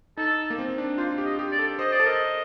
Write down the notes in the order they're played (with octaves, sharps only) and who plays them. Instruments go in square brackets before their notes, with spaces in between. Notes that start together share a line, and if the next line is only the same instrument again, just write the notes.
[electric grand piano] D#4 [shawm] A4
[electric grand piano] A#3
C4
D4
[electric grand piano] F4 [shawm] C5
[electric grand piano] G4
[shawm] D#5
[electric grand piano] G4
[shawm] D5
[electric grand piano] A4
[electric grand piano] C5 [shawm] D#5
[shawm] D5
[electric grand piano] A4
[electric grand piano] A#4 [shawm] D#5